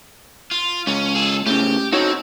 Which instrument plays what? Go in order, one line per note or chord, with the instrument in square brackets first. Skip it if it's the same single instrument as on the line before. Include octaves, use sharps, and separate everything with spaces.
[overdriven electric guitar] F4
[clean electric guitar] C#2 [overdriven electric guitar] C#4
[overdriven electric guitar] G#4 A4
[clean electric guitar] A2 C#3 [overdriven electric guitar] G4
[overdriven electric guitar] C4 [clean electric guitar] D#4 F#4 C#5